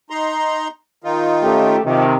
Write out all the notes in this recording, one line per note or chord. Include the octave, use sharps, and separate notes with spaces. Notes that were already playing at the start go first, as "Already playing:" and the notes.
D#4 A#5 C6
D#3 D#4 F4
A3 C#4 G4
C3 D#3 F3